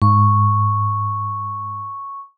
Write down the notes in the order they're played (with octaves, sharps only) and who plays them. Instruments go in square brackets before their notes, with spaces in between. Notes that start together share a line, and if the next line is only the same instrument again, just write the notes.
[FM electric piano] G#2 [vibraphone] C#6